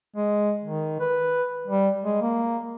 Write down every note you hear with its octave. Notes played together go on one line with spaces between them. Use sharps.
G#3
D#3
B4
G3
G#3
A#3